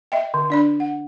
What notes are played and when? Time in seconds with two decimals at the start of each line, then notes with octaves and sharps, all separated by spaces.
0.12 D#5 E5 G5
0.34 D3
0.50 D4 D5 B5
0.80 F#5